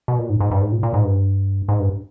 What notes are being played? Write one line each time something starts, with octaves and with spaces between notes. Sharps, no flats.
B2
A#2
G#2
G#2
G2
G#2
A#2
A#2
G#2
G2
G#2
G2